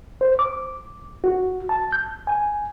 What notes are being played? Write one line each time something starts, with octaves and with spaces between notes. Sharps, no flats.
C5
D6
F#4
A5
G6
G#5